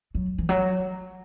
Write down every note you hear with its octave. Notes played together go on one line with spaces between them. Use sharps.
F#3
E3
F#3